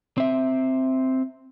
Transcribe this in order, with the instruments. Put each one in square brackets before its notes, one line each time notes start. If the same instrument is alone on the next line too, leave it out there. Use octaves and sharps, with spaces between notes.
[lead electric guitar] C4 E5